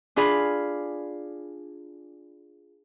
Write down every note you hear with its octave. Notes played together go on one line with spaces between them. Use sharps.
D4 F4 G#4 F5 B5